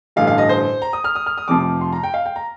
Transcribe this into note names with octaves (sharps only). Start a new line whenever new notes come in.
A1 G2 D3 F5
F5
D#5
C5
A#5
D#6
F6
D#6
F6
D#6
F1 F2 C3 F3 D6
C6
A#5
G5
F5
G5
A#5